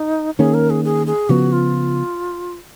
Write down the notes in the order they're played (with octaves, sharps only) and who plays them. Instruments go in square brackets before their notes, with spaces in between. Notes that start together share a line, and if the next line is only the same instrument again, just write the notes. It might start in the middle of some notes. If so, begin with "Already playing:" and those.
Already playing: [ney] D#4
[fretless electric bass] D#3 A#3 C#4 [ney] G#4
[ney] A#4
G#4
G#4
G#4
[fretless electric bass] C#3 F3 B3 [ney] F#4
[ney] F4